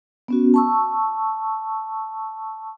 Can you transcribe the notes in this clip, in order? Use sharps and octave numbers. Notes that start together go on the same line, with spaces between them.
B3 C#4 F#4
A5 C#6 E6